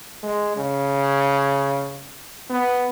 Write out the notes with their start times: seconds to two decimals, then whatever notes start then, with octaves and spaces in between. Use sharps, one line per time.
0.23 G#3
0.56 C#3
2.50 B3